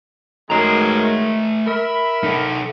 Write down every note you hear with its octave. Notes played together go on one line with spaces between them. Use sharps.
F#2 D#3 G#3 A3 A#5
A#4 E5 B5
D#4 A4